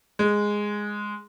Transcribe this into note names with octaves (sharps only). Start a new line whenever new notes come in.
G#3